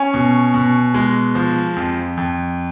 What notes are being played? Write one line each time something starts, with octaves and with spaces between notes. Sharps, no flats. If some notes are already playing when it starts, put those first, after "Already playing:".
Already playing: C#4 G#5
B2
B2
G#3
F3
F2
F2